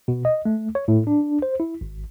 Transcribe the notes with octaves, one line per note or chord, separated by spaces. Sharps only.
B2
D#5
A3
C#5
A2
D4
C5
E4
G#1